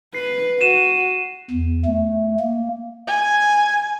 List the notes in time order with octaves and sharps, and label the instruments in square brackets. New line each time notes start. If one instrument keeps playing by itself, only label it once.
[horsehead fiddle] B4 [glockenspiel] C7
[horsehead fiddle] F#4 [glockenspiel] D#7 E7
[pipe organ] E2
A3
A#3
[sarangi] G#5